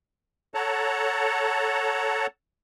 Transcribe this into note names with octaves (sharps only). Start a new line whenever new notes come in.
A4 C#5 F#5 A5 A#5